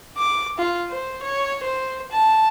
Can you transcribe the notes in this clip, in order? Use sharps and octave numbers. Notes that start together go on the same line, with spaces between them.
D6
F4
C5
C#5
C5
A5